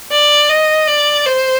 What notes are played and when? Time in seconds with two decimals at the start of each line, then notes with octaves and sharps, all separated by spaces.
0.12 D5
0.49 D#5
0.87 D5
1.26 C5